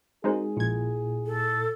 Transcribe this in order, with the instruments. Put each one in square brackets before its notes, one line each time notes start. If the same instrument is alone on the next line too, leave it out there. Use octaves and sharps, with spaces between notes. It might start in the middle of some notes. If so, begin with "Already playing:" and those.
[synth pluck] G#3 D#4 C5 [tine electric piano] C4 F#4 A#4 [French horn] G#4
[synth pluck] A#1 G#6 [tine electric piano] A#2 E4
[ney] A4